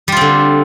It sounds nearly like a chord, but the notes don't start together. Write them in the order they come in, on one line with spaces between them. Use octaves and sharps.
G3 F4 C4 D3